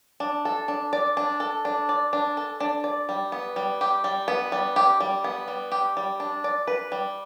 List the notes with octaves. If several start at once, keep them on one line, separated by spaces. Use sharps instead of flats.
D4
A4
D4
D5
D4
A4
D4
D5
D4
A4
D4
D5
G3
B3
G3
G4
G3
B3
G3
G4
G3
B3
G3
G4
G3
D4
D5
B4
G3